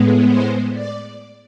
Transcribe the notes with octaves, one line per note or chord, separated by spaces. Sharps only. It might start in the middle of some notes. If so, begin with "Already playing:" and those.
Already playing: A2 G#3 B3
C5
D5